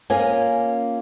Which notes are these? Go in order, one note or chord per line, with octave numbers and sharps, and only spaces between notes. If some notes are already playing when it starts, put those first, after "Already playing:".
A#3 C#4 F4 G#4 G#5